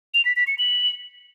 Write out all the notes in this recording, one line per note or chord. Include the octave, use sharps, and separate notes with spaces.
F7
B6
B6
C#7
F#7